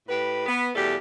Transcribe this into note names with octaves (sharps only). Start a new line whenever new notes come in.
A2 G4 B4
B3
E2 B2 G3 A3 G4